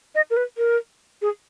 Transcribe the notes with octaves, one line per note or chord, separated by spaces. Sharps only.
D#5
A#4
B4
A#4
G#4